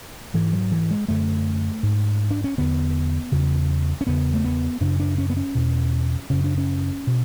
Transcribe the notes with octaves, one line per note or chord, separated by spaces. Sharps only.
G#2 E3
F#3
E3
G#3
F#2 D3 A3
G#2
D4
C#4
E2 D3 B3
E2 C#3
C#4
E2 C#3 B3
A3
B3
F#2 C#3 D4
D4
C#4
B3
C#4
E2 B2
F#2 C#3 C#4
D4
C#4
B2